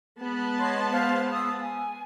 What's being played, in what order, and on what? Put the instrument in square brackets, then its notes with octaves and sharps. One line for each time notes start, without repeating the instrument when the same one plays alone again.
[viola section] G#3 B3 A5
[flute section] C#5 D#5 C6
C5 F5
F5 D#6 E6
G#5